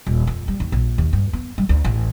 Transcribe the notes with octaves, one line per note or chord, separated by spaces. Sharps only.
D#1
F2
G3
D#2
A#1
D#2
G2
B3
G3
D2
A1